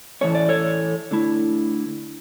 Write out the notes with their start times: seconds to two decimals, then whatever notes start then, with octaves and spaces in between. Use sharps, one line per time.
0.21 A2 E3 A3 C#4 C#5
0.35 D5
0.49 A4 C#5
1.11 D3 A3 E4